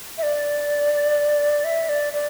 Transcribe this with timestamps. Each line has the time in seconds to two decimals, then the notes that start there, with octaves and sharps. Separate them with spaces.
0.18 E5
0.23 D5
1.64 E5
1.89 D5
2.13 D5